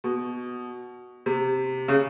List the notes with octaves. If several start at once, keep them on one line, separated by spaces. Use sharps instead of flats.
B2
C3
C#3